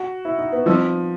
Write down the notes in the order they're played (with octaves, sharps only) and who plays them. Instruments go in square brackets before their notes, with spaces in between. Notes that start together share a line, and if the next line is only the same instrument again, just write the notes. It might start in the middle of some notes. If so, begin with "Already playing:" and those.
Already playing: [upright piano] F#4
E4
D#4
B3
[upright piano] F3 [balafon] G3 C4 D#4